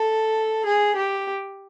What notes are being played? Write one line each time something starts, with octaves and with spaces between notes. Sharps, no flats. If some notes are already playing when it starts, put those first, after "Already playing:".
Already playing: A4
G#4
G4